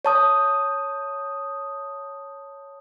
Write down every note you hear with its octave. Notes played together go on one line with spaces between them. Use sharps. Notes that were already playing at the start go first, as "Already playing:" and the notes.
C#5 A5 D#6